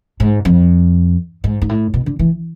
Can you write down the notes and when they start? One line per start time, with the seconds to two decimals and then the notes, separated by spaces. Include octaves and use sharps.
0.20 G#2
0.45 F2
1.44 G#2
1.62 G#2
1.69 A2
1.94 B2
2.06 D3
2.19 E3